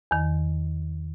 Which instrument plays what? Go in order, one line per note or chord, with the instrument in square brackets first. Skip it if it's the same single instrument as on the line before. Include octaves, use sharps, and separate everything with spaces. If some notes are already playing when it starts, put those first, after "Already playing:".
[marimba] E2 D#3